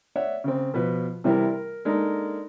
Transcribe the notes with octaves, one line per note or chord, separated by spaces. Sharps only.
C#5 D5 E5 F#5
C#3 C4
B2 F3 B4
C3 E3 G3 C4 E4 A#4
A#4
G#3 A#3 D4 D#4 A4 A#4